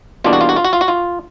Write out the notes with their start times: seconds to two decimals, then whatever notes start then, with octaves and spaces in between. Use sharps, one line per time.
0.24 E2 B2 G3 A#3 D4 F4
0.33 F#4
0.41 F4
0.49 F#4
0.56 F4
0.65 F#4
0.73 F4
0.81 F#4
0.88 F4